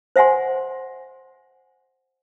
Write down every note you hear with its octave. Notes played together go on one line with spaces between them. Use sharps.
C5 E5 F#5 G#5 C6